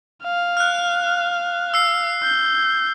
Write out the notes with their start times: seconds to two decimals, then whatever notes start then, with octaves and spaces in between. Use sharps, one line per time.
0.23 F5
0.57 F6 F#6
1.74 E6 C7
2.23 G6